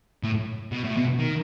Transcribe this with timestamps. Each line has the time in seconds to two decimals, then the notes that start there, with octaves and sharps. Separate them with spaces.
0.23 A2
0.72 B2
0.84 A2
0.97 B2
1.19 D#3